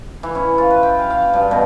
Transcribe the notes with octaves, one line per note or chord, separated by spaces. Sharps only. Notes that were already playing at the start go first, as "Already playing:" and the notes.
E3
C#4
F4
B4
G5
F5
F5
G5
G2
B2